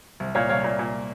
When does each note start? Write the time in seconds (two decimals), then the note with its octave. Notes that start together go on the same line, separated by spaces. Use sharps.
0.20 C2
0.35 A#2 C#5 F5
0.49 C2 C#5 F5
0.64 A#2
0.79 A#2